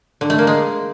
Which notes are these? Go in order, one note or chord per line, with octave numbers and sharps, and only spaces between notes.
D3
A3
A#3
G#3